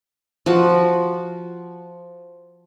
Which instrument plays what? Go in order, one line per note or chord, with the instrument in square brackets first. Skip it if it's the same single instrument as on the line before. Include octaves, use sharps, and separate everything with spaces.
[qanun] F3 F#4